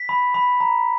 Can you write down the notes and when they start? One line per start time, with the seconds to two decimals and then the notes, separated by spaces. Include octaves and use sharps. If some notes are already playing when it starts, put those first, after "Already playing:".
Already playing: B6
0.09 B5
0.34 B5
0.61 A#5